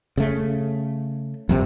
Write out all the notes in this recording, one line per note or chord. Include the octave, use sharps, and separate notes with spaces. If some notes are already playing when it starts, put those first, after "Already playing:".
C#3 A3
A#1 G2 C3